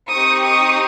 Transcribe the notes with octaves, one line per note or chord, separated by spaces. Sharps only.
C4 D#4 G4 C#6 D#6
C#6 D#6